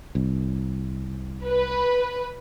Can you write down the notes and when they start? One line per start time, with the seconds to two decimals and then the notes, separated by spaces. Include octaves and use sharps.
0.15 C2
1.46 B4